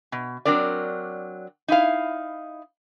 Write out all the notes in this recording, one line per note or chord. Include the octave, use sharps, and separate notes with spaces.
B2
F#3 C4 D4 A#4 D5
D#4 E4 F5